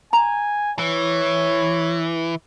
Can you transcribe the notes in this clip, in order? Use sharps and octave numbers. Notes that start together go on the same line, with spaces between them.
G#5 A#5
E3 C#5